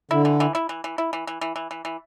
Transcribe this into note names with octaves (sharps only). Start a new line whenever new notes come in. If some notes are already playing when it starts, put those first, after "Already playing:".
D3 E4
E3
E3
E4
E3
E3
E4
E3
E3
E3
E3
E3
E3